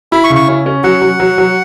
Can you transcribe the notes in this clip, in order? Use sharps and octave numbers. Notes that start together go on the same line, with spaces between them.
E4 B5
C#6
C#3
C#6
C#4
C#4
F#3 F#5
F#3
F#3
F#3